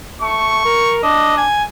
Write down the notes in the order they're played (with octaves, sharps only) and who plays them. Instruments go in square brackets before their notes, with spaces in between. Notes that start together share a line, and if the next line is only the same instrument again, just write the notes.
[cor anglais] A3 [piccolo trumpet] C#6
[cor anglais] A#4
[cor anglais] D4 [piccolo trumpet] D#5
[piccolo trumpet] G#5